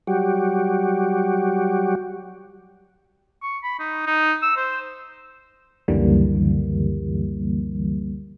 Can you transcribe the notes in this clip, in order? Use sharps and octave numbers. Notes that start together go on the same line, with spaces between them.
F#3 G3 F#4 G4
C#6
B5
D#4
D#4
E6
C5
C#2 F#2 D3 E3 G3 A#3